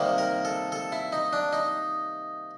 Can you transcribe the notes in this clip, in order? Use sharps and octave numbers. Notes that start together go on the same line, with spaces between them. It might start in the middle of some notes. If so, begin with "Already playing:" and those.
Already playing: C3 D#3 G3 A#3
A#4
A4
A4
E4
D#4
D4
D#4